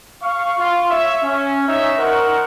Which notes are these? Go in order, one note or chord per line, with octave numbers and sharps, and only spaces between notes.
F5 C#6
F4
C#5 E5
C#4
D#4 C#5 E5
D#4 A#4 C5 F#5 C#6